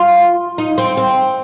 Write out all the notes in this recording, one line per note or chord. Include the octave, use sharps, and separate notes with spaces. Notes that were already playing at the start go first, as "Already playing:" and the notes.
Already playing: F4
D#4
C4
C4